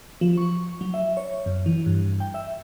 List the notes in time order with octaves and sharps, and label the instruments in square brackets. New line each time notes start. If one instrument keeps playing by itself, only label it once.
[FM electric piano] F3
C#6
F#3
E5
C#5
F#2
E3
G2
G5
E5